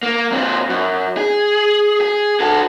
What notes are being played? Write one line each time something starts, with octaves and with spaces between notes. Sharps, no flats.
A#3
A#2 C4
F#2
G#4
G#4
F#4 A4